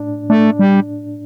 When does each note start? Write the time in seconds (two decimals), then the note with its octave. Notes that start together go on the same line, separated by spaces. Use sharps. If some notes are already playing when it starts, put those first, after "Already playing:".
Already playing: A2 D4
0.30 A3 D4
0.59 G3